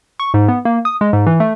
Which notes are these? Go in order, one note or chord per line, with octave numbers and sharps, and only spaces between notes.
C#6
G#2
B3
A#3
D#6
G#3
G#2
E3
A3